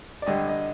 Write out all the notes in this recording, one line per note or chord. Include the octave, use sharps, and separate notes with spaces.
D5
G2 D3 G3 D#5
D#5